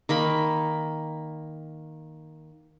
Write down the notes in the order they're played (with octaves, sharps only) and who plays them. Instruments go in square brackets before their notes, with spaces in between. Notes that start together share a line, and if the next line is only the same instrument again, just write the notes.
[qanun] D#3 A#3 B5